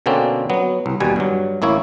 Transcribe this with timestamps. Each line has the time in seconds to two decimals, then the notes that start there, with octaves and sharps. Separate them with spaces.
0.06 B2 D3 A#3 C4 C#4
0.50 F#3 B3
0.86 C2
1.00 D#2 B2 G3 G#5
1.16 G2 F#3
1.62 A1 A#3 E4 C#5